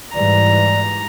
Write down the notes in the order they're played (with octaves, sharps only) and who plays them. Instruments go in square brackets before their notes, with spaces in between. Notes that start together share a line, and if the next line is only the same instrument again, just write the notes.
[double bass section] G#2 E3 G3 [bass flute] D5 [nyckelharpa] A#5